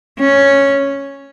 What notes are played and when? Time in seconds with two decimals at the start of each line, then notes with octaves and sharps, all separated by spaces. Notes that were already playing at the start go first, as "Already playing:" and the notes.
0.19 C#4